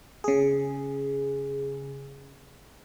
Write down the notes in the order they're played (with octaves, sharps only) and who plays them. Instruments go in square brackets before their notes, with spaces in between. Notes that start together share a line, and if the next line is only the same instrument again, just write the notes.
[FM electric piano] C#3 G#4